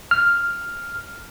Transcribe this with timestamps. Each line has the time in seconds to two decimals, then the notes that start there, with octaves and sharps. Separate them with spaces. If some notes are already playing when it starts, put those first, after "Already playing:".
0.11 F6